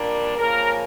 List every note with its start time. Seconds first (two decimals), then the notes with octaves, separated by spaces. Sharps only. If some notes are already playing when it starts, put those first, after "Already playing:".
Already playing: A#2 G3 A#3 D4
0.35 C#3 F3 A#3 C#4 A#4